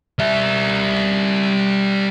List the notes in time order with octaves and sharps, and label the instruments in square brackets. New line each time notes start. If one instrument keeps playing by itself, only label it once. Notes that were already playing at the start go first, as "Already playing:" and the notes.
[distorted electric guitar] G3 E5